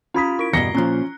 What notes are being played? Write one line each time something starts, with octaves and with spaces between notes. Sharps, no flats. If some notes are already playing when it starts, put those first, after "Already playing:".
C#4 F4 B5 D#6 G#6 B6
E4 D7
E2 G2 B2 A#5 A#6 C7 C#7 G7
A#2 F3 C#4 A#5 F#6